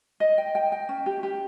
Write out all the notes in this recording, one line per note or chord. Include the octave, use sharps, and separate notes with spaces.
D#5
G5
G5
G5
C#4
G4
G4